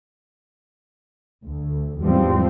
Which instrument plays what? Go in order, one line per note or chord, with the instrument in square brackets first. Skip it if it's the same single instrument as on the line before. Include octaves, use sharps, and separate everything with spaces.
[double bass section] D2
E2 G#2 F3 G3 C4